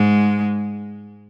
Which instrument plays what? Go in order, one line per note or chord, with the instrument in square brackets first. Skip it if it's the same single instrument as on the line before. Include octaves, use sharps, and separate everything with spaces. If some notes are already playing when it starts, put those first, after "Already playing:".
Already playing: [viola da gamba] G#2 G#3